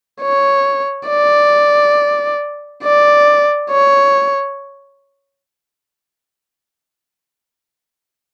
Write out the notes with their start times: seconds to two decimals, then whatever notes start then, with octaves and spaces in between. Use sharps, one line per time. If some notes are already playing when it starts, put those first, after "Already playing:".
0.22 C#5
1.08 D5
2.84 D5
3.70 C#5